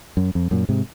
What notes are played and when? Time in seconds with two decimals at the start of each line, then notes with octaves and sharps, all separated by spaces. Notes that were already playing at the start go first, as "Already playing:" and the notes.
0.17 F#2
0.35 F2
0.51 F#2 A#2
0.69 G#2 C3